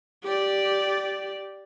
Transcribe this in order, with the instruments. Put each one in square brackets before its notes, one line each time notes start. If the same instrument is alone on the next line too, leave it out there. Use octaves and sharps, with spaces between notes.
[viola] G4 D5